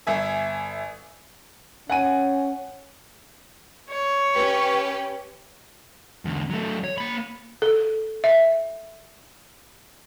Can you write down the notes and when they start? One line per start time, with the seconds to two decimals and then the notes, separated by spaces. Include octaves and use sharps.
0.07 G1 E5 G#5
1.90 C#4 F#5 G#5 D#7
3.90 C#5
4.34 C#4 G4 B4
6.25 E2 D3
6.50 F#3 A3
6.84 C#5
6.98 A#3 B5
7.62 A4
8.24 E5